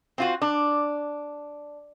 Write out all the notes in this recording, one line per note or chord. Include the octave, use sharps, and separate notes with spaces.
C4 F4 F#4
D4